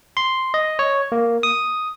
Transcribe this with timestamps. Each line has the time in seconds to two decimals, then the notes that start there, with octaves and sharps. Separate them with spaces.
0.17 C6
0.54 D#5
0.79 C#5
1.12 A#3
1.43 D#6